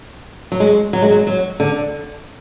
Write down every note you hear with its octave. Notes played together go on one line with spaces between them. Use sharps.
F#3
G#3
F#3
G#3
F#3
F#3
D3